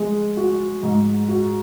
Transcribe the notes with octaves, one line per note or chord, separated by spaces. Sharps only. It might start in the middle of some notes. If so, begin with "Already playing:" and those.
Already playing: G#3
F#4
G#2
F#4